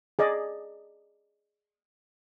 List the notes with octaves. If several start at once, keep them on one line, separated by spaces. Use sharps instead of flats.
G#4 D5 D#5